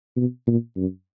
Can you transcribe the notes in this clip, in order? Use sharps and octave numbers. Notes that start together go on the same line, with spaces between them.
B2
A#2
F#2